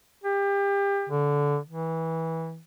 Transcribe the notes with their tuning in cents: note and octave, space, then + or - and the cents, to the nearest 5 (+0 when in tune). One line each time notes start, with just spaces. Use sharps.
G4 +30
D3 -20
E3 -20